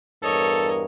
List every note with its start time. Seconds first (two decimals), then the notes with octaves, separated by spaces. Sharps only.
0.23 E2 G2 A4 A#4 C#5 D#5